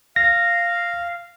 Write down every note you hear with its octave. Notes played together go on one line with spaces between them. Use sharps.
F5 A#6